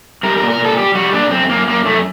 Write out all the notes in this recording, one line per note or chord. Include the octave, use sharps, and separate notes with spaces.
G3 A#4
A#4
A#2
A#4
A#2
A4
G3 G4
G3 F#4
A#2 D4
F#2 C4
F#2 A#3
F#2 A#3
F#2 A3